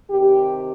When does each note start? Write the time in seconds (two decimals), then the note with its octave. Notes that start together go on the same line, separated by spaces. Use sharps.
0.11 C3 D#3 G4